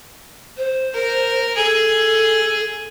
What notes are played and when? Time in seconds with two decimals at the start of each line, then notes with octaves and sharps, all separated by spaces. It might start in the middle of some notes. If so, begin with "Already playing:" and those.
0.57 C5
0.94 A#4
1.56 G#4 A4